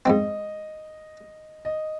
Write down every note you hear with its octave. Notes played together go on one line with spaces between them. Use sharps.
G#2 F3 C4 D#5
D#5